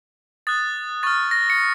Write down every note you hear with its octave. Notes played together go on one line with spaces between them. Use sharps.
D#6 F#6 A6
C#6 F6 A6
A#6
C#7